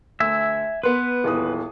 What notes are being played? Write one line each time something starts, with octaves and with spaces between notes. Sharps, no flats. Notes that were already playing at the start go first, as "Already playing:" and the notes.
D2 E5 G#5 E6
B3 B4 C6
D#1 E2 D#6